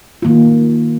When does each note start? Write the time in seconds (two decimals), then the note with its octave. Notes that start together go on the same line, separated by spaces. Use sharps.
0.22 D#3 A#3 F4